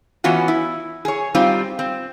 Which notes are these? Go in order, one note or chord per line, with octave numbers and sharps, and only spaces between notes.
E3 B3 C#4 F4 F#4
E4
G#4 C#5
G3 C4 D#4 F4
C4